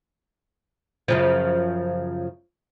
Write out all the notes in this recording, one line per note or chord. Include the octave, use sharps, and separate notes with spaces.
F#2 C#3 F3